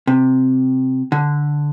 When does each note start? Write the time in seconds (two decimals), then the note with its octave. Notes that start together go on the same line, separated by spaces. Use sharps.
0.07 C3
1.12 D3